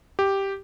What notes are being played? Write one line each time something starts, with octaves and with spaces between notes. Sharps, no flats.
G4